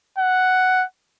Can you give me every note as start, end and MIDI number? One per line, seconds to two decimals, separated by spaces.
0.18 0.85 78